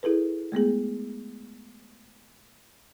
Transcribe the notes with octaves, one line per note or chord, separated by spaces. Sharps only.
E4 G#4 A4 B4
G#3 A3 B3 G#4